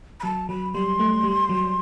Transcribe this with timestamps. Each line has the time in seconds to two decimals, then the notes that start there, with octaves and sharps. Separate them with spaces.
0.20 B5
0.23 F#3 A5
0.49 F#3 B5
0.73 G3 C6
0.99 A3
1.23 G3
1.49 F#3